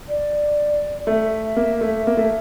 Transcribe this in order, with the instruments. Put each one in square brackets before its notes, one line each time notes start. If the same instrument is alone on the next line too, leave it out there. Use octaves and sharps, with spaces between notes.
[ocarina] D5
[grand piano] A3 [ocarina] E5
[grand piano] A#3
A3
A#3
A3